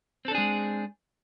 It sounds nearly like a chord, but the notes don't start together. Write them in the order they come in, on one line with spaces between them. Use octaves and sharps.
C4 A4 D4 G#4 G#3